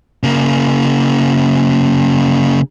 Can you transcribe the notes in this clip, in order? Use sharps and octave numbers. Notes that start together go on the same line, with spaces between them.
C#3 A#3